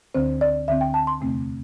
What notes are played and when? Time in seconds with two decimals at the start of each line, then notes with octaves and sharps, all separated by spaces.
0.14 D2 D3 C4 C5
0.41 D5
0.68 D2 D3 C4 E5
0.81 G5
0.94 A5
1.07 C6
1.21 E2 C3 A3 C4